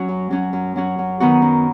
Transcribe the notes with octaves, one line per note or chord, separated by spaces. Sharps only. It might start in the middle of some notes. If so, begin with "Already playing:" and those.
Already playing: F#3 C#4 F#4
F#2
F#3 C#4 F#4
F#2
F#3 C#4 F#4
F#2
D#3 B3 D#4 F#4
F#2